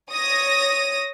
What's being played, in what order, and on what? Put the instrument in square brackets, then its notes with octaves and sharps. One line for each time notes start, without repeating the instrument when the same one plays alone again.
[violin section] C#5 D#6 A#6